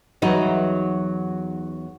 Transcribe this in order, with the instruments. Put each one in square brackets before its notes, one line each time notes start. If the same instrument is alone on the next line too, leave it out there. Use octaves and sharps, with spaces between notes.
[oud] E2 F#3 D#4